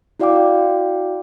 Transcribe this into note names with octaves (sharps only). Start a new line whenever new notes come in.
E4 F#4 D5 F5 G5 D6